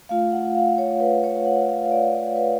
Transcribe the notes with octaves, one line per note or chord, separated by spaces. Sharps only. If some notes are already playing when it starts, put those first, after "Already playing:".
A3 F4 F5
F#5
F5
C#5
B4
C#5
F#5
F5
F5
D5
B4